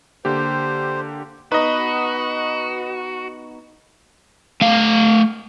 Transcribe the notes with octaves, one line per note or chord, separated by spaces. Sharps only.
D3 A#3 G4 C5
B3 D#4 F#4 B4 D#5
A3 F5